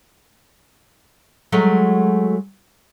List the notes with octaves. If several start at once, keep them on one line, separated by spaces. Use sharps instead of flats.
F#3 G#3 A3